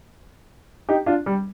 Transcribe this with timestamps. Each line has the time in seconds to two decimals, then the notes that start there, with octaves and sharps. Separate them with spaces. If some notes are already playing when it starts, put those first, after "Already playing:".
0.89 D#4 G4
1.06 D4 F4
1.26 G3